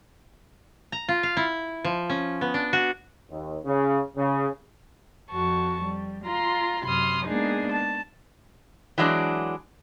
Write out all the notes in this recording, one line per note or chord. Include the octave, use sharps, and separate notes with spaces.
A#5
F4
F5
E4
F3
C#4
B3
D4
F#4
D#2
C#3
C#3
F2 F#4 A5 C#6
G3
F4 A#5 C6
F#2 C3 B5 C6 D#6 F6
G#3 A#3 B3 D4 D#4 G#4
A5
E3 F#3 G#3 D4